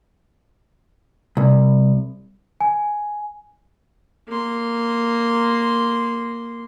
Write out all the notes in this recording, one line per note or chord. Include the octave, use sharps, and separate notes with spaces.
C2
G#5
A#3 C6